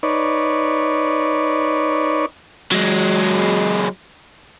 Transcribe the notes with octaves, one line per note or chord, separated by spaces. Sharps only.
D#4 B4 C#5 D5
F#3 G#3